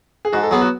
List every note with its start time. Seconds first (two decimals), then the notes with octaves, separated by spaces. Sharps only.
0.25 G#4
0.33 G#2 F#4
0.43 A4
0.51 F#3 B3 G#4
0.62 F#4